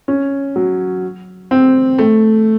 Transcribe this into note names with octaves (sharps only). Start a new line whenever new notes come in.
C#4
F#3
C4
A3